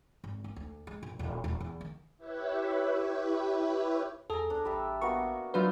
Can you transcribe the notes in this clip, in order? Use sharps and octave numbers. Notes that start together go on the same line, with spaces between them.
G#1
A#3
D2
G#3
A#1
D#1
D#1
E2
D#3
E4 G4 B4 C#5 E5
E2 G#4 A4 A#5
D2 D4
A1 G3 E5 A5
A#3 B3 F#4 C#6
F#3 D4 E4 F4 B4 F5